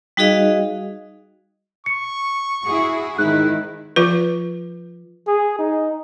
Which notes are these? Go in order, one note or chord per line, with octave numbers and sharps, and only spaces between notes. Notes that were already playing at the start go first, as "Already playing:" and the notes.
G3 D#4 F#4 G#4 D#5 F5
C#6 C#7
E4 F#4 G#4
G#2 D#3 E4 F#6
F3 F4 B4
G#4
D#4